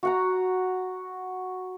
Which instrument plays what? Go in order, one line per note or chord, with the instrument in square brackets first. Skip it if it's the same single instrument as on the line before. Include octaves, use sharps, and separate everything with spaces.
[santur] F#4 F#5 A#5